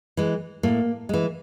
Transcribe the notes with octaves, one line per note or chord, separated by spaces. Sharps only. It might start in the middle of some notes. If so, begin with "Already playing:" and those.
E3 G#3
A2 A#3
E3 G#3